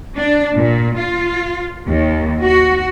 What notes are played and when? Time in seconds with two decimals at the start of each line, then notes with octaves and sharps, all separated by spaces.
0.15 D4
0.56 A#2
0.98 F4
1.87 D#2
2.42 F#4